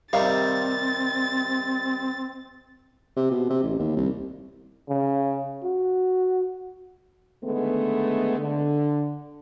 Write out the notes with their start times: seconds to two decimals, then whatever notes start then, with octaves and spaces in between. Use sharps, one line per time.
0.13 C3 D#3 G3 C4 F5 A6
3.16 C3
3.31 B2
3.50 C3
3.63 A1
3.79 D#2
3.97 C2
4.89 C#3
5.63 F#4
7.44 D3 D#3 G#3 A3 B3
8.39 D3